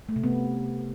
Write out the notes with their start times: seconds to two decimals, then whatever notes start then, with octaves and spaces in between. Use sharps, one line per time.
0.09 A3
0.16 C3
0.24 B3